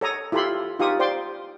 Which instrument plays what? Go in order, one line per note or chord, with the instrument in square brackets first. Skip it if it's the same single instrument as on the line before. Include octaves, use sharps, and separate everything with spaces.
[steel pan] A4 C#5 A#5 D#6
E4 F4 G4 A4 B5 C6
D#4 F4 G4 F5 C#6 D#6
C5 D5 G5 C6 D6